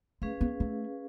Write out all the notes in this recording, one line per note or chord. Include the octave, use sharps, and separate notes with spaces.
A3 C#4 G#4 B4 F5
B3
A3